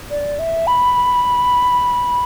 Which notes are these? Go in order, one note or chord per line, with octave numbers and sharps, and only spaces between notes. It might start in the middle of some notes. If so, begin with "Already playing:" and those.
D5
E5
B5